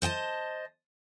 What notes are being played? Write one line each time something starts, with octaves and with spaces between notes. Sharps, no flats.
C5 D#5 G5 A5